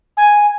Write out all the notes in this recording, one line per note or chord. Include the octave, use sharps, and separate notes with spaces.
G#5